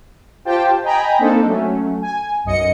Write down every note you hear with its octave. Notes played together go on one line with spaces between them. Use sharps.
F4 G4 C5 G5 A5
D#5 G5 G#5 A#5 B5
A#3 C4 D4 D#4 A4
F#3 A3 C#4
G#5
B1 F#2 D#5 C#7